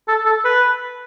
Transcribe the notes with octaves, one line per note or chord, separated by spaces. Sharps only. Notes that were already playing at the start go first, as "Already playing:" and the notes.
A4
A4
B4